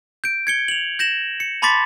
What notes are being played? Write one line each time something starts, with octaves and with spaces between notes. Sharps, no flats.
G6 D7
G#6 C#7 G7
F7 F#7
G6 A#6 E7 F#7
C#7
A5 B5 C6 D6 A6 B6